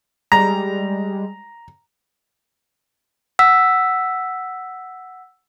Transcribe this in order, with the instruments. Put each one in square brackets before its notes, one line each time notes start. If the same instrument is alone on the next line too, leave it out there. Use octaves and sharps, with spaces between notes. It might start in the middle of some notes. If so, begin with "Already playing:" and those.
[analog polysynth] G3 G#3 [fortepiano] A#5
[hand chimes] F#5 E6 B6